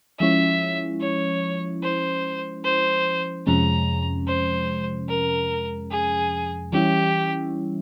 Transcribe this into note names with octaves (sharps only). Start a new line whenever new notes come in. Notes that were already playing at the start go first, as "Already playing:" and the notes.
F3 G#3 C#4 E4 E5
C#5
C5
C5
F2 C3 F3 G#3 C#4 A#5
C5
A#4
G#4
E3 G3 C#4 E4 G4